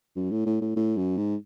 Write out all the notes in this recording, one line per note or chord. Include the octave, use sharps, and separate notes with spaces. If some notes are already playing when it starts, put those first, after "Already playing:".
F#2
A2
A2
A2
A2
F#2
G#2